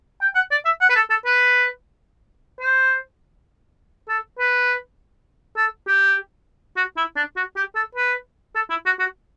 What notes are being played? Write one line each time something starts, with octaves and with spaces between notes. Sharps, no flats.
G5
F#5
D5
E5
F#5
B4
A4
A4
B4
C5
A4
B4
A4
G4
F#4
E4
D4
F#4
G4
A4
B4
A4
E4
F#4
F#4